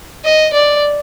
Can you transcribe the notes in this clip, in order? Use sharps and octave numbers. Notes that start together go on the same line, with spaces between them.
D#5
D5